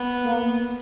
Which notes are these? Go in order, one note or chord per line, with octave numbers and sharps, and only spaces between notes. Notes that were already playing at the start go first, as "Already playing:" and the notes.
Already playing: B3
A#3